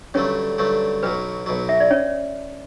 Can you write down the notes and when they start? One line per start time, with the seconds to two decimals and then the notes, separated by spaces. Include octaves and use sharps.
0.14 G2 D3 F#3 A3 C#4 C#5
0.58 G2 D3 F#3 A3
1.03 B1 B2 F#3 B4
1.46 B1 B2 F#3
1.69 E5
1.80 D5
1.91 C#4 C#5